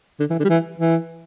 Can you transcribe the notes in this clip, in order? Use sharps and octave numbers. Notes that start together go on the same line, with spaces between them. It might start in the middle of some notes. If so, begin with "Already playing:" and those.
D3
E3
D3
G3
E3
E3